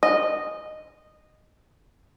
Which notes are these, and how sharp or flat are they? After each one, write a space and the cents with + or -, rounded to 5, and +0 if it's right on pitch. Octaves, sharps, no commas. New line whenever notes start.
D#5 -15